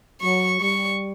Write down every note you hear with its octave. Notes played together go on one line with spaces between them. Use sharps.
F#3 C#6
G3 C#6